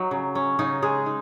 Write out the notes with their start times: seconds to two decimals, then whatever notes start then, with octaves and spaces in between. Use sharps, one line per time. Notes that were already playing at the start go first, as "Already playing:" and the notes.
Already playing: F#3 D#4
0.11 C#3
0.35 C#4
0.59 C#3 D#4
0.82 G#3 G#4
1.06 D#4